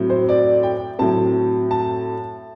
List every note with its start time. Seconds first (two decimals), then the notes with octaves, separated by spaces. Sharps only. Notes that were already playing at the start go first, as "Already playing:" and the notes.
Already playing: A2 F#3 C4
0.10 C5
0.29 D5
0.63 G5
0.99 A2 F#3 C4 A5
1.71 A5